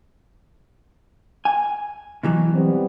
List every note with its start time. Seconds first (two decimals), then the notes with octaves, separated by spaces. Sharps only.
1.45 G#5
2.23 B2 E3 F#3
2.54 G3 B3 C4